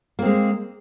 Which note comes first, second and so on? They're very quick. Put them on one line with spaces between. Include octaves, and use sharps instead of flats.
A#3 C4 G#3